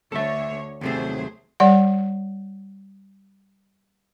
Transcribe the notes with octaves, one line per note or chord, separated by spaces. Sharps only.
D2 D3 A4 C#5 E5
D#2 C3 F#3 A3 G#4 C5
G3 D5 F#5